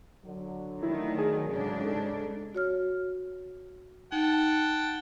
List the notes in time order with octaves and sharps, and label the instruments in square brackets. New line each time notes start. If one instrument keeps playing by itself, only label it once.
[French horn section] D3 F#3
[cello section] D#3 A3 [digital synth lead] E4
[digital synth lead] G#4
[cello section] G#2 C#3 D4
[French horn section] G3 D#4 A4
[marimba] F#4 C#5 F6
[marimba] D#4 [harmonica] F#5 G5 A5